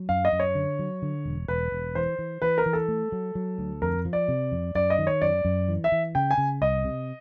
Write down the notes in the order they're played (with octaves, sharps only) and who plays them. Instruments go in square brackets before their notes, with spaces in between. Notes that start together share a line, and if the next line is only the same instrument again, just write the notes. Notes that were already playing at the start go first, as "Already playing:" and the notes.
Already playing: [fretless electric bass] F#3
[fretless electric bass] F#2 [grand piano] F5
[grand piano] D#5
[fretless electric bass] F#2
[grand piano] C#5
[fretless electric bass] D3
F#3
D3
E1
[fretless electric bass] E1 [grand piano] B4
[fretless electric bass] E1
[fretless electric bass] E3 [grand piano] C5
[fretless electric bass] E3
[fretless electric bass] E3 [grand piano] B4
[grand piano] A#4
[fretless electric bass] E3
[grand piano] A4
[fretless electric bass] A3
F#3
F#3
D2
[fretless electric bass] F2 [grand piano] A#4
[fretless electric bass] F3
[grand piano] D5
[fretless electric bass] C3
F2
[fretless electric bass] F#2 [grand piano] D5
[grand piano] D#5
[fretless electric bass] D#3
[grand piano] C#5
[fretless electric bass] F#2 [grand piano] D5
[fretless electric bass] F#2
E3
[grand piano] E5
[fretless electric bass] E3
[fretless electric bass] C#3 [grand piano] G5
[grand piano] G#5
[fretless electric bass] C#3
[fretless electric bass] C2 [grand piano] D#5
[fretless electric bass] C3